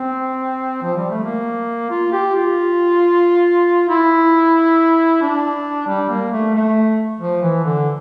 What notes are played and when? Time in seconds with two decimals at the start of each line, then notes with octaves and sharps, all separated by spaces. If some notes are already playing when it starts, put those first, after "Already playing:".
Already playing: C4
0.83 F3
0.97 G3
1.11 A3
1.24 A#3
1.90 F4
2.12 G4
2.35 F4
3.89 E4
5.21 D4
5.87 G3
6.10 A#3
6.32 A3
6.54 A3
7.20 F3
7.42 E3
7.65 D3